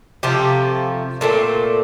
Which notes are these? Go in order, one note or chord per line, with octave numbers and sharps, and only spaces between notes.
C3 F3 A3 G4
A#2 A3 C4